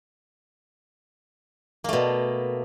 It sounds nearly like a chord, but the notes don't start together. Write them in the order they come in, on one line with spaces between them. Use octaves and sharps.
A#3 A3 B2